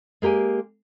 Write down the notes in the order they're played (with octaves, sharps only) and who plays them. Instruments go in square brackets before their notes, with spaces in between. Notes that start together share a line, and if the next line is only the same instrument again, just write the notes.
[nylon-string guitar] G#3 A#3 G4 G5 G#5